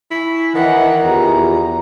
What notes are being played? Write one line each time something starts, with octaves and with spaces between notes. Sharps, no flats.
E4 G#5 C#6
D#3 E3 C#5 D#5 F#5 G5 A#5
E2 B3 F4 G4 A#5